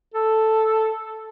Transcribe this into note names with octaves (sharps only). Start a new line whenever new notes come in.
A4